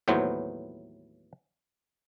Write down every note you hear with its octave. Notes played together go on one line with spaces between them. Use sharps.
D#2 A2 E3 F#3 B3 C5